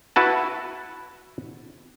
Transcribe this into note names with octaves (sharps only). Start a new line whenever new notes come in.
E4 F#4 B4 A5